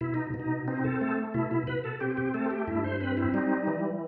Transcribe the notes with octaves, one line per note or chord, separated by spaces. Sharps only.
B2 E4
D#4
B2
D#4
C4 D#4
A4
A3 A4
B2 E4
E4
B2 B4
A4
C4 G4
G4
A3 A4
G4
G2 E4
C5
C4 B4
E4
G3 D#4
E3